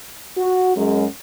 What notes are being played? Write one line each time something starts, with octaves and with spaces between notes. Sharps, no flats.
F#4
F#2 G#3